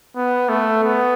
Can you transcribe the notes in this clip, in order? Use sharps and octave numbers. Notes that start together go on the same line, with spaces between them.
B3
A3
B3